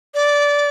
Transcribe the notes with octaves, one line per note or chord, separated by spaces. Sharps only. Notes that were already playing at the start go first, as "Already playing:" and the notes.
D5